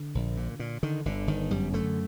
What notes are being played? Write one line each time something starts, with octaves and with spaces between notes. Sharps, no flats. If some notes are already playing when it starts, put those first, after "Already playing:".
Already playing: D3
A#1
A#2
A#2
D3 D#3
G1 D3
G1 D#3
F#2 G3
D3 A3